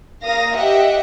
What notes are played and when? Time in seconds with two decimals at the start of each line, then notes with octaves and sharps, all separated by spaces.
0.24 A#3 F5 D#6 A#6
0.56 G4 D#5 E5 F#5 G5